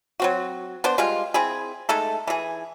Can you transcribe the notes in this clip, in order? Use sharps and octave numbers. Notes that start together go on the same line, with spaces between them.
F#3 C4 F#4
B3 D4 C5
G3 G#3 F4
C4 E4 G#4
G#3 A3 D#4 A4
E3 G#4